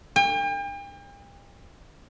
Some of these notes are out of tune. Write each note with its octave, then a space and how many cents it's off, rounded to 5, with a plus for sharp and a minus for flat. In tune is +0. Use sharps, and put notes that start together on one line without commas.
G5 +40